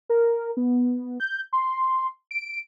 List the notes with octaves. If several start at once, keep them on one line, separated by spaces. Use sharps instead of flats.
A#4
B3
G6
C6
D7